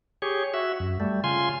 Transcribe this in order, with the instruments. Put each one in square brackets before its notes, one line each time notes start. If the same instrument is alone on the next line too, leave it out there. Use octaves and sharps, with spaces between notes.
[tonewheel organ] G4 G#4 C#5
F#4 E5
F#2
G3 A3
C#3 F4 G#5 C6